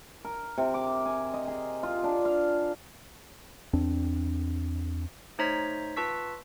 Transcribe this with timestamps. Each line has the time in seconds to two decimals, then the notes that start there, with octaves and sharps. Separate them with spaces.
0.25 A#4
0.58 C3
0.74 D6
1.06 G#5
1.34 D#5
1.47 G#4
1.83 F4
2.04 D4
2.25 F5
3.73 E2 C4 D4
5.39 A3 D#4 C5 C#5 A#5 B6
5.96 F4 B4 A5 C#6 E6 B6